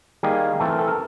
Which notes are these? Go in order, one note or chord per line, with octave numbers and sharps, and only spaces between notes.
D#3 G3 A#3 G#4
E3 A3 C4 A4
A#4
A4
A#4